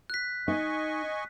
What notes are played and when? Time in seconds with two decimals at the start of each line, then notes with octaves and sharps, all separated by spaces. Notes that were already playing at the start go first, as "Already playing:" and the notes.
0.10 F#6 B6
0.48 D#4 D#5 G#5 C#6